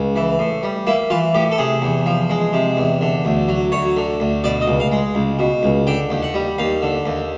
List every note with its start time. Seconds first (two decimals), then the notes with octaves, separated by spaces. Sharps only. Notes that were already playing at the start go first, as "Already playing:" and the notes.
Already playing: C#2
0.16 E3
0.39 A2
0.63 G3
0.87 A#3 E4
1.10 E3 F4
1.35 A2 G4
1.51 A4
1.58 C3 G#4
1.82 E2
2.06 F3
2.30 G#3
2.53 C3
2.77 E2
3.01 D3
3.25 D2
3.48 F#3
3.72 D2 C#5
3.97 D3
4.20 D2
4.44 B2 D5
4.61 D#5
4.68 C#2
4.80 F5
4.92 G#3
5.15 C#2
5.39 B2
5.63 C#2
5.87 D3 G5
6.10 D#2
6.22 F#5
6.34 G3
6.58 D#2 F5
6.82 D3
7.06 D#2